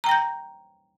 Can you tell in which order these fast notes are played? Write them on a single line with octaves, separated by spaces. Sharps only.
A#5 G5 A#6 G6